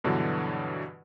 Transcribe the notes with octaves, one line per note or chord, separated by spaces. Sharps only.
G2 B2 D3 E3 F#3